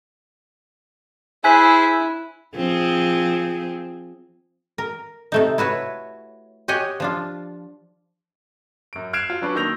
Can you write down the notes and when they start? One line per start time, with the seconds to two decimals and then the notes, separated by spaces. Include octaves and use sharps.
1.44 E4 G#4 C5 E5 G#5 F#6 B6
2.56 F3 C4 G#4
4.78 A#4
5.32 C3 A3 D#4
5.58 E4 F#4 B4 C#5
6.68 G4 C#5 D#5 F#5 G#5
7.00 F3 D4 F4
8.93 F#2 D7
9.13 F6 F#6 G#6 C7 D7 E7
9.30 F4
9.42 F#3 C#4 D4 B4
9.55 D#3 A#3 E6 G6 A#6 F7